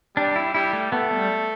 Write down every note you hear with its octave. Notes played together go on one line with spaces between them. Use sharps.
G3 D4
E4
G3 E4
A3
A3 B3
G3